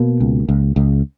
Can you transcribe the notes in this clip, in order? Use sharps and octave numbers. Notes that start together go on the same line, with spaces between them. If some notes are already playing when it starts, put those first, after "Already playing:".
Already playing: B2 A#3
C#2
C#2
C#2